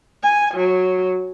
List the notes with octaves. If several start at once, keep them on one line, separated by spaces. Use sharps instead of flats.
G#5
F#3